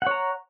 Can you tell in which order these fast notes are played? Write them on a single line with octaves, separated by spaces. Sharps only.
F#5 C#5 A#5